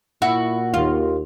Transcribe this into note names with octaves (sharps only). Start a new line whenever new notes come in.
A#2 E4 F#4
D#2 F4